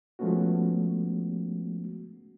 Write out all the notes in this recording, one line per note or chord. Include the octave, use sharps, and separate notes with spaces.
F3 G#3 A3 B3 C#4 F#4